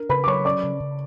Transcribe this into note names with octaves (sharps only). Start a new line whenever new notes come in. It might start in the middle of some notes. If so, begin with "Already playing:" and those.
Already playing: D4 A#4
C#3 B4 B5
D6
F#3 C#5 C#6
C#4 D5 D6
C#3
C#3